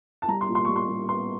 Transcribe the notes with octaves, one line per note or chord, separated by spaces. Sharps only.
A5
G3 A#5
C6
A#2
C6
G3 C#6
C6
G3
B3 C6